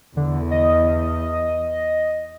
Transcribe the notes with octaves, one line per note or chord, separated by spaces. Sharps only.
E2 D3
D#5